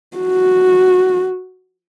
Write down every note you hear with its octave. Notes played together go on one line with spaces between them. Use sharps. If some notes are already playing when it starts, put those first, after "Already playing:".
F#4